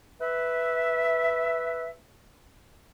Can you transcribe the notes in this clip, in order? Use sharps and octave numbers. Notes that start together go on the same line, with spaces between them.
B4 E5